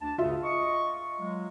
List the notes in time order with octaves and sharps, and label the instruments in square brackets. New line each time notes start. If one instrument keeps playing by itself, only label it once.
[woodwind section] D2 D4 A5
[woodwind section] C#2 G2 C#3 [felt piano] F4 E5
[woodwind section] D#5 C#6
F#3 G#3